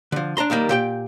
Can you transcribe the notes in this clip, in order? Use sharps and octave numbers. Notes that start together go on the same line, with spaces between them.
D3 F3
D4 A5 A#5 C6
D#2 D#3 G3 A#3
A#2 G4 G5